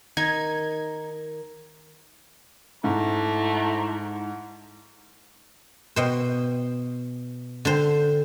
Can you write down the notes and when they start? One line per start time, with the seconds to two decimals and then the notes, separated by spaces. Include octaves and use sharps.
0.17 D#3 D#4 G#6
2.84 G#2 A3 E4 C5 A#5
5.96 B2 C5
7.65 D3 C5